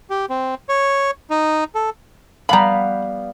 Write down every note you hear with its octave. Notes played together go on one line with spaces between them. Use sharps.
G4
C4
C#5
D#4
A4
G3 B3 F5 A#5 B5